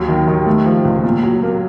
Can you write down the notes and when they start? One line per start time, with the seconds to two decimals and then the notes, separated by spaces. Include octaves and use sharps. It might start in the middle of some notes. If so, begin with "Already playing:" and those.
Already playing: D#2 F#3
0.08 D#3
0.27 D#3
0.46 A3
0.66 F3
0.85 C#2
1.04 A#2
1.23 F#3
1.43 A#3